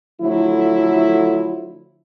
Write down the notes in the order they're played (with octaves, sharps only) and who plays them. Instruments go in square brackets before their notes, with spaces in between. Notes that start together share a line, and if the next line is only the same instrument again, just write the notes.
[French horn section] D3 F3 F#3 A3 E4